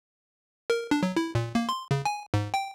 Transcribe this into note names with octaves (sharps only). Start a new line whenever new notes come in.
A#4
D4
F#3
E4
A#2
A#3
C6
C#3
G#5
G#2
G5